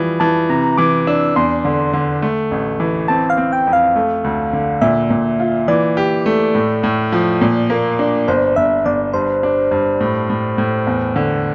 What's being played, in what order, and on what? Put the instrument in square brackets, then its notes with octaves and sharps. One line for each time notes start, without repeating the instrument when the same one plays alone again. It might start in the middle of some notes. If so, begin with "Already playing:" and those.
Already playing: [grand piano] E3 F3 G3
[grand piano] E3 [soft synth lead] A5
[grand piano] C3 [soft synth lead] A#5
[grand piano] E3 [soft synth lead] D6
[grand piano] D4 [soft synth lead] E6
[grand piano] E2 [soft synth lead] C6
[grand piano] D3
D3
A3
A1
E3
[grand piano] C4 [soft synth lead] A5
[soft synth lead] F5
[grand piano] C4
[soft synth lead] G5
[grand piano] F2
[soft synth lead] F5
[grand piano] A3
D2
D3
[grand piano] A#2 [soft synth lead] E5
[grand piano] A#2
F4
[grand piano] E3 [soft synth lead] D5
[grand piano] G4
A3
A2
A2
F3
A#2
A#3
D4
[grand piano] G1 [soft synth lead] C5
[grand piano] G1 [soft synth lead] E5
[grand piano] G1 [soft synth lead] D5
[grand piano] G2 [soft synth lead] C5
[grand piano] D4
G2
A2
A2
A2
E2
D3